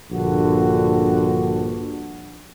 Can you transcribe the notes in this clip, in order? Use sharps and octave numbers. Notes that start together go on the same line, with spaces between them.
A#1 G2 D3 F#4